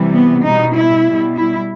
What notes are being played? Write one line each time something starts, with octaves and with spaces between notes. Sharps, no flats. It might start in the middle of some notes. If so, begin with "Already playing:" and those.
Already playing: C3 E3 G3
B3
B2 G3 D#4
E4
B2 G3
E4